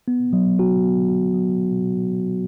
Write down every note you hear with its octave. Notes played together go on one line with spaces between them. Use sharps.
B3
F#3
F#4
B3
F#4
F#3